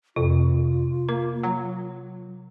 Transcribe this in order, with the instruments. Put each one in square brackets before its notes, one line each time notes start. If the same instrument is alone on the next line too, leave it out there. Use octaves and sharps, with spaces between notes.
[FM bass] F2 [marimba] C3 [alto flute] F4
[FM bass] A#3 [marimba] A#4
[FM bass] F#3